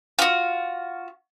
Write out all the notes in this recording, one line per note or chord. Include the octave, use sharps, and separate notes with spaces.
F4 F#4